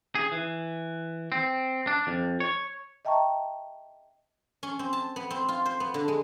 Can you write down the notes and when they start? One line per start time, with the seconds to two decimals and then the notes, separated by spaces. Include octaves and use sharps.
0.15 G#4
0.32 E3
1.32 C4
1.87 D4
2.07 F2
2.40 C#5
3.05 D#5 E5 G5 A5 A#5 C#6
4.63 C#4
4.79 C4
4.93 A5
5.16 B3
5.30 C4
5.49 F4
5.66 C5
5.80 B3
5.94 D3
6.08 G#3